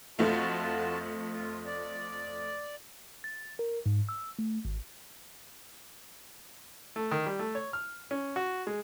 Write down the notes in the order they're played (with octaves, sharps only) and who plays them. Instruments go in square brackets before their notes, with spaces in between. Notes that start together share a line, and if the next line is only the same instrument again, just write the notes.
[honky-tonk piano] F2 A3 [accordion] F4 F#4 A5
[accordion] F4
D5
[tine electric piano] A6
A#4
G#2
E6
A3
G#1
[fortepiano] A3
D#3
G3
A3
C#5
F6
C#4
F#4
G#3